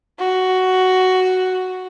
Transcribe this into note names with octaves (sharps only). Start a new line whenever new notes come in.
F#4